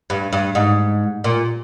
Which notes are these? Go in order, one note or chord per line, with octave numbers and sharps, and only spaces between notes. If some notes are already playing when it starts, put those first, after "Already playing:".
G2
G2
G#2
A#2